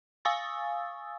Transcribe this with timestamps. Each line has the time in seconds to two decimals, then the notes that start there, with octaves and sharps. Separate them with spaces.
0.25 F5 G#5 C#6 D#6 E6 A6